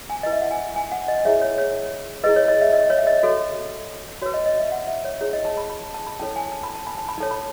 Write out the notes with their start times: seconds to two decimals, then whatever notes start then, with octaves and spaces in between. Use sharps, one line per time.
0.10 G#5
0.23 E4 B4 D#5
0.32 E5
0.41 F#5
0.51 G#5
0.76 G#5
0.92 F#5
1.08 D#5
1.25 E4 G#4 C#5 E5
1.42 C#5
1.58 C#5
2.23 E4 G#4 B4 D#5
2.36 C#5
2.48 D#5
2.61 E5
2.74 D#5
2.90 C#5
2.98 E5
3.07 D#5
3.23 F#4 A4 C#5
4.22 F#4 B4 C#5
4.34 D#5
4.46 D#5
4.59 E5
4.72 F#5
4.87 E5
5.05 C#5
5.21 E4 G#4 C#5
5.33 D#5
5.45 A5
5.57 B5
5.70 B5
5.82 A5
5.94 A5
6.07 B5
6.19 C#4 E4 A4 C#5 A5
6.36 G#5
6.52 A5
6.63 B5
6.75 A5
6.87 B5
6.98 A5
7.08 B5
7.18 D#4 A4 C#5 A5
7.31 B5